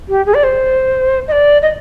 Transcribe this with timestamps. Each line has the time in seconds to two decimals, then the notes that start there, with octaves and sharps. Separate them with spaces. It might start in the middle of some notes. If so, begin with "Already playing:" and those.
0.09 G4
0.26 G#4
0.34 D5
0.44 C5
1.28 D#5
1.32 D5
1.62 D#5